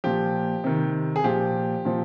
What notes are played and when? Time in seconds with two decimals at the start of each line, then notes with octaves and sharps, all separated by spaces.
0.04 A#2 F3 G4
0.64 C3 D#3
1.16 G#4
1.24 A#2 F3 G4
1.85 A#2 F3